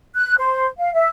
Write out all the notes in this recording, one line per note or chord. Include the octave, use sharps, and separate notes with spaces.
F#6
C5
F5
E5